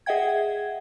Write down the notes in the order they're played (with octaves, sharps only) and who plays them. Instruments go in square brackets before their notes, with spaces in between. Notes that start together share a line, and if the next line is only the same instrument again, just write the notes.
[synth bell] G#4 D#5 E5 F#5 G5 G#6